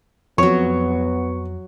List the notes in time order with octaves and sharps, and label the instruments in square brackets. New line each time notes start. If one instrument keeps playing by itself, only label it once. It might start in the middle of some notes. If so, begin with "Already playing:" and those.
[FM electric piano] F2 [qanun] F#3 C#5 [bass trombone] B3 [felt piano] C#6